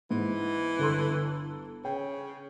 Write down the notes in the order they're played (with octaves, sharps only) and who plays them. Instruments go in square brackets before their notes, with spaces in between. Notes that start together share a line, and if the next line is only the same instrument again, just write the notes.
[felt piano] G#2 [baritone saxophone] E3
[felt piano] G1 A4 C6
[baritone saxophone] C#3 [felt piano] C#5 G5